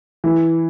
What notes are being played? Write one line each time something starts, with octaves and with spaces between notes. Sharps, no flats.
E3